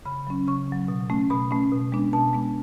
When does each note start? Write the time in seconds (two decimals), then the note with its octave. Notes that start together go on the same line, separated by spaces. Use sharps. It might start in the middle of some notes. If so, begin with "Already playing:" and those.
0.05 C#3 B5
0.27 F#3 C#4
0.47 C#3 C#6
0.68 F#3 C#4
0.88 B2
1.10 A3 C#4
1.30 B2 B5
1.51 A3 C#4
1.72 B2
1.92 G#3 B3 D4
2.13 B2 A5
2.33 G#3 B3 D4